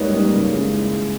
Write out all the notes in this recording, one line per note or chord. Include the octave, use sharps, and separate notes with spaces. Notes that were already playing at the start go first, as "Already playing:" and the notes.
Already playing: G#2 G3 A#3 D#4 B4 C#5 D#5
G3 A#3 D#4
C#3
G#3 C#4 E4